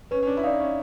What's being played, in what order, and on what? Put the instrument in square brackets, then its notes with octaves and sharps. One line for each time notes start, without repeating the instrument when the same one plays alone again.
[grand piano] C#4 [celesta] B4
[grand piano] C#4
D4
E4
[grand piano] D#4 [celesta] D5 F5
[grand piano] C#4